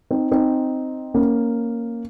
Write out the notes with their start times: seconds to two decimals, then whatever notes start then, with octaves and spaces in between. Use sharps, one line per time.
0.11 C4 D#4
0.31 C4 D#4
1.14 A#3 C#4